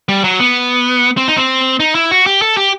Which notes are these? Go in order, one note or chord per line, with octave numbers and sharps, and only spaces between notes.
G3
F#3
B3
C4
D#4
C4
D#4
E4
F#4
G4
A4
G4